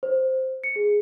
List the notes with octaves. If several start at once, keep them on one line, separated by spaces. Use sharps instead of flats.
C5
C#7
G#4